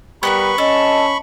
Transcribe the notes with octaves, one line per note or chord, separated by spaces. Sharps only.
G3 B3 A#4 B4 B5 C#6
C#4 A4 D#5